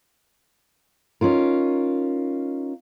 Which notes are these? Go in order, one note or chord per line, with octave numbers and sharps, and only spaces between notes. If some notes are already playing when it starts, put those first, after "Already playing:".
C#4 D#4 F4 A#4